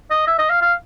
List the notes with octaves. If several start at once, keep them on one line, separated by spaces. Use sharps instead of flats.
D#5
E5
D#5
F5
F5